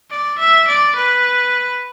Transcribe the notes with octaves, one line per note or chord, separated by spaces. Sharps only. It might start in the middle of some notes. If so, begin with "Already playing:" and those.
D5
E5
D5
B4